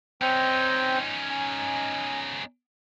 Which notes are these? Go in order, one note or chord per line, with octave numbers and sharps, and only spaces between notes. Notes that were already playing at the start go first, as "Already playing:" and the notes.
C4 C#4 D#4 G5
G#5